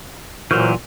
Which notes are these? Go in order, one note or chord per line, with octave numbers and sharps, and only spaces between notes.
A#2 E3 F#3 F#4 A#4 C5